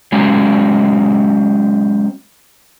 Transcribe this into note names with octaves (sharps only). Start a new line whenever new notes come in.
F#3 G#3 C4 C#4